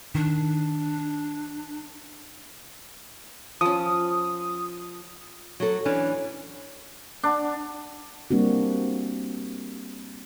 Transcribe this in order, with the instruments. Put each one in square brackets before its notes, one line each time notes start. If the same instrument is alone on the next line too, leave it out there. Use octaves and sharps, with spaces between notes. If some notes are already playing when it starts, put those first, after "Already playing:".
[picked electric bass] D#3 [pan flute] D4
[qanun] F3 C#4 [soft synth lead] D#6
[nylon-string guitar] F#3 A4
[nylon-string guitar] E3 D4 [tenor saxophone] C#4
[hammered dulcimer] D4
[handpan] G3 A#3 C4 D4 F#4